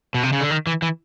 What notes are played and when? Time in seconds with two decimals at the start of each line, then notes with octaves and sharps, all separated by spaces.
0.14 B2
0.23 C3
0.33 C#3
0.41 D3
0.51 D#3
0.67 E3
0.82 E3